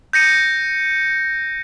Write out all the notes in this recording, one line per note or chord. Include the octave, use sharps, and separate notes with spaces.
G6 A#6 C#7 D#7